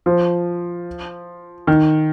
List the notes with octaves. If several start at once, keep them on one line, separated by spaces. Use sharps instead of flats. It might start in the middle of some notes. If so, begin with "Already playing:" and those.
F3
D#3